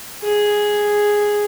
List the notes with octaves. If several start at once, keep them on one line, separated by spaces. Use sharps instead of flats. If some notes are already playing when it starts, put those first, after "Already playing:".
G#4